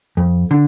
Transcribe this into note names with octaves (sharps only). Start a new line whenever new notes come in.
F2
D3